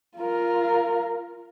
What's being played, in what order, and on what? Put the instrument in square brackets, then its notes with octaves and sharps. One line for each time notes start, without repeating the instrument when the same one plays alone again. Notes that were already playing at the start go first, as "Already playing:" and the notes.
[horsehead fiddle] F4 A#4